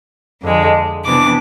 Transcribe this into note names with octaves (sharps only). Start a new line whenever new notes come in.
F2 D3 G#3
C3 E3 B3 D4 D6